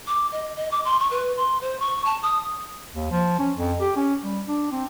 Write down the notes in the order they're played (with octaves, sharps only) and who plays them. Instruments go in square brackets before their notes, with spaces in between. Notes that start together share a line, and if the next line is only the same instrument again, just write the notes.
[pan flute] D6
D#5
D#5
D6
C6
C#6
B4
C6
C5
C#6
A5
D#6
[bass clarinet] D#2
F3
C#4
F2
G4
C#4
G3
D4
C4